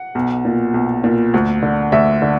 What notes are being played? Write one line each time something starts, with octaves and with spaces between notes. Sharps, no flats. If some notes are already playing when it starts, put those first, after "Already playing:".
Already playing: F#5
B1
A#2
B1
A#2
D2
D3
D2 E5
D3